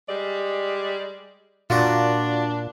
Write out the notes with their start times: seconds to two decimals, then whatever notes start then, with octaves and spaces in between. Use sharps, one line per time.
0.08 G3 G#3 D5
1.70 A#2 D4 F4 F#4 D5